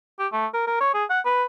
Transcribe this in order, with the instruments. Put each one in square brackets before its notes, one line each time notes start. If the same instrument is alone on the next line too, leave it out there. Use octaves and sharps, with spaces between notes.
[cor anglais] G4
A3
A#4
A#4
C#5
G#4
F#5
B4